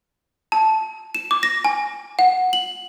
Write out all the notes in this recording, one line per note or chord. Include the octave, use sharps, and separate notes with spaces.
A5
E7
D6
A#6
G#5
F#5
F#7